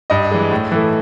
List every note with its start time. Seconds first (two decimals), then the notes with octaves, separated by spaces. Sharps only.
0.10 G2 D#5
0.31 E3 G#3
0.51 A2
0.72 E3 A3